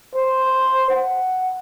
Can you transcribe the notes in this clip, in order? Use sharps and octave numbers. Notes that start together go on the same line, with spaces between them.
C5
F#5